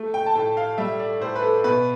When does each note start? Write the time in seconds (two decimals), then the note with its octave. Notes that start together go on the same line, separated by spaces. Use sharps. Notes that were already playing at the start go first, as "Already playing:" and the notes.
Already playing: A3
0.14 G5
0.26 A5
0.35 A2 G5
0.57 F5
0.78 G3 E5
0.99 D5
1.21 A2 C5
1.35 B4
1.42 A4
1.64 B2 B4